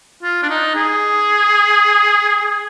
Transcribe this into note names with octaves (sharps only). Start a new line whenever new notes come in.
F4
D4
D#4
G#4